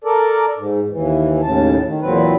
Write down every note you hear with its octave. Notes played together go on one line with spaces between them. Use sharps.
A4 A#4 D5
G#2
D#2 E3
D#2 A2 C#3 A5
D#3
E2 A#2 F#3 C4 B4